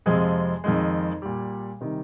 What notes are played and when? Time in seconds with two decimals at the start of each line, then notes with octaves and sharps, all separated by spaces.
0.06 F2 C3 F3 G#3 G#4
0.64 F2 D#3 G#3
1.22 A#2 G3
1.81 C3 D#3 G3